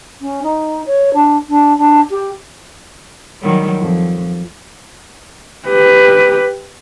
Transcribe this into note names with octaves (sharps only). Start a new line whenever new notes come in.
C#4
D#4
C#5
D4
D4
D4
G4
D#3 F#3 G3
F2
G4 B4